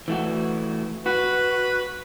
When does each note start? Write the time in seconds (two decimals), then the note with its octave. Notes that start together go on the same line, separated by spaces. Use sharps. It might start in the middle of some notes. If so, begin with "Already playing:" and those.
0.08 E3 A3 F#4
1.06 F#4 B4